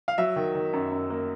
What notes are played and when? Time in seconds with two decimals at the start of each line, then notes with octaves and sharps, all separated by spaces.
0.08 F5
0.18 F#3 E5
0.36 D#3
0.55 D#3
0.73 F#2
0.92 F#2
1.10 A#3